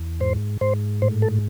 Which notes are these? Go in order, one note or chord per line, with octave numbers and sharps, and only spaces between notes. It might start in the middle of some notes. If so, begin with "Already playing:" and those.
Already playing: E2
G#2 C5
G#2 C5
A2 C5
A4